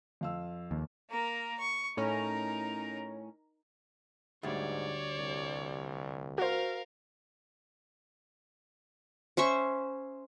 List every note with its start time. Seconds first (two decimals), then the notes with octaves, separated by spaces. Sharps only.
0.21 F2 F5 E6
0.71 D#2
1.10 A#3 A#4
1.59 C#6
1.97 A2 C#4 D#4 A#4
4.43 D2 G#2 G3 C#5 D5
5.18 C2
6.38 F#4 A#4 C5 F5
9.37 C#4 C5 E5 C#6